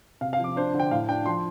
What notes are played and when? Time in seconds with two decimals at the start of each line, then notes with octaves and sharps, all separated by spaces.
0.21 C3 F5
0.33 F5
0.40 F3 D6
0.56 D4 C5
0.74 D3
0.80 G5
0.91 A2 F5
1.09 D4 G5
1.26 F3 C6